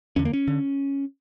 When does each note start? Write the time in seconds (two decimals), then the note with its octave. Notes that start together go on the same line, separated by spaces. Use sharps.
0.16 E2 D3 C#4
0.25 A#3
0.33 C#4
0.48 D3